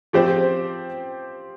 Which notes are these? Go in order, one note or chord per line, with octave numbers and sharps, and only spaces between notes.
F3 C4 G4 C5